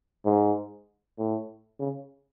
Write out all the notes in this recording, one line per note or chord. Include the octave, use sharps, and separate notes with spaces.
G#2
A2
C#3